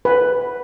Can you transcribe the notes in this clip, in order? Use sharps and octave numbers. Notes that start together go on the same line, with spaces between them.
B4